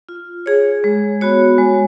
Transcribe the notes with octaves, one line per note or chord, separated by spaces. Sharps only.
F4
G#4 C#5
G#3
B3 F#4 C#5
G#3